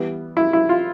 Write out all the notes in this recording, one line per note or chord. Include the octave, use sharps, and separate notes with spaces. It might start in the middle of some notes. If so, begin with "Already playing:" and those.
Already playing: E3 G3 B3
E4
E4
F4